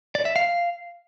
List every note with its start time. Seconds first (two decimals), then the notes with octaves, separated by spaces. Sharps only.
0.15 D5
0.25 E5
0.36 F5